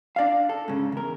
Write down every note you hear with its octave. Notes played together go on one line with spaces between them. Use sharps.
D4 D5 E5 F5
A4
G#2 C#3
E2 A#4